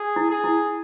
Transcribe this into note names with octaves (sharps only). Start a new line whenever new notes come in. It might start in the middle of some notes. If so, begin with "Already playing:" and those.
Already playing: G#4
E4
G#4
E4